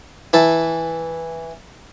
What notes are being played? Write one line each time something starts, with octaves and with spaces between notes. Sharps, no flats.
E3 E4 A5